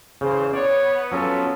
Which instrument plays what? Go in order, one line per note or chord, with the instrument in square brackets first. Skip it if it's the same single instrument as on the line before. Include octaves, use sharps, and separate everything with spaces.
[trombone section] E2 E3 C5 [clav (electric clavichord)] C#3
[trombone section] B3 [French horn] C#5 [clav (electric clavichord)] D5
[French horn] F3 [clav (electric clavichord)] F#3 C#4 A4